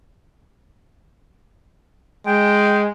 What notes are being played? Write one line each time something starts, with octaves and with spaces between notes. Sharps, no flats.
G#3 G5